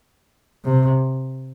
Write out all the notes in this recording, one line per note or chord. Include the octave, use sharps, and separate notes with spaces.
C3